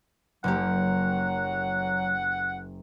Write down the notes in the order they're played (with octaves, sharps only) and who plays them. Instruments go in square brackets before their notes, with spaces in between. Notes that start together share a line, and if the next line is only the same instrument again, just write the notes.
[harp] F#1 A#3 G4 [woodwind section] F#3 [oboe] F#5